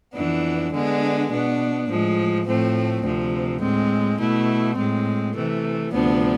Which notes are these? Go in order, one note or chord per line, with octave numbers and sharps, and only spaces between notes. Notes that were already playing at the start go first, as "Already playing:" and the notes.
F2 E3 B3 D4
D3 G#3 B3 D4
B2 B3 D4
A2 F3 G#3
A2 F3 A3 C4
D2 C3 F3
A2 G#3 C4
B2 A3 E4
A2 G#3 C4
C3 E3 A3
D2 C3 F3 B3 D4